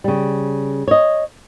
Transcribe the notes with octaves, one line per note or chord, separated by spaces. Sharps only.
C#3 G3
C#5 D#5